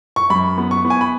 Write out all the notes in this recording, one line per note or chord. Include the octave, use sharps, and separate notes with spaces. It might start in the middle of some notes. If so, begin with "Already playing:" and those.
C#6
F#2 B5
B3
C#6
B3
G#5
B5